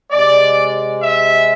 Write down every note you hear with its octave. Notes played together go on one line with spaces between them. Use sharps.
C3 G#3 D5
E5